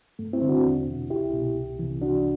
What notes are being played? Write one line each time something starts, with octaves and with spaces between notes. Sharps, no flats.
G2 A3
C4 E4
D3
D4 F#4
E2
B2
C2 E4 G4
B2
C2
C3 E3
C2 D4 F#4